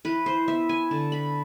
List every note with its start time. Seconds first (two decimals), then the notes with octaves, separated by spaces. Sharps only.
0.05 E3 B4
0.26 C5
0.48 B3 E5
0.69 G#5
0.91 D3 A5
1.12 B5